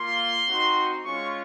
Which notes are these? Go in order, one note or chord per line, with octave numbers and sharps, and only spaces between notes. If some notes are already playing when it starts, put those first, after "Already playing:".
Already playing: A#3 F4 C6
C4 D#4 F#4
G#3 C#4 F4 C#6